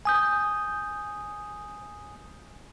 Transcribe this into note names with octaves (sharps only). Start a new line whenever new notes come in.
G#5 D#6 G6